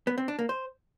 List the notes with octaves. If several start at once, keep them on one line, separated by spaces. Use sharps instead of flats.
B3
C4
D4
A#3
C5